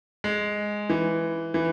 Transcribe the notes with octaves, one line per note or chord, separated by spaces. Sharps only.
G#3
E3
E3